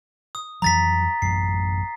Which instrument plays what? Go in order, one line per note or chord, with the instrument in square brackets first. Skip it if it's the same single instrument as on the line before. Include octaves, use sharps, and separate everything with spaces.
[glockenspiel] D#6
[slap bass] F2 E3 F#3 [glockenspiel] A#5 A6 B6
[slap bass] A1 F#2 [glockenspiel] C7